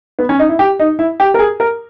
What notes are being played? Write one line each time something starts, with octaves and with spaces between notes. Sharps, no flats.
B3
C#4
D#4
E4
G4
D#4
E4
G4
A#4
G#4
A#4